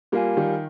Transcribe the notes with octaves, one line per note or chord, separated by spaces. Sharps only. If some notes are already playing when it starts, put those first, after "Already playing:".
G3 A#3 F4 A#4 F5 G#5
D#3 G3